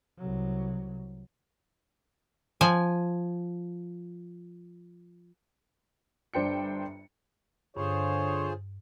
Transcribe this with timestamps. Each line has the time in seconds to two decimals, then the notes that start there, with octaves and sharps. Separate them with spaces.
0.18 C2 F#3
2.61 F3 G#5
6.34 G1 D4 C5 G5 C#7
7.77 G2 D3 F4 G#4 C5 C#5